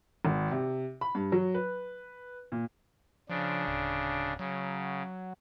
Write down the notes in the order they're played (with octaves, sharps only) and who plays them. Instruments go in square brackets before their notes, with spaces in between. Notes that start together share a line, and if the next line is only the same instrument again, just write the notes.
[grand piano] G#1
C3
B5
G2
F#3
B4
A#2
[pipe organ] C#3 D4 [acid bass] F3
[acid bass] D1
[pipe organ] C#3 [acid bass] F#3